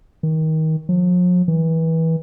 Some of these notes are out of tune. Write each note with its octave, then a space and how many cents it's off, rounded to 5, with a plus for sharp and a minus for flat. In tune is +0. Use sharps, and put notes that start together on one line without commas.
D#3 +25
F3 +45
E3 -25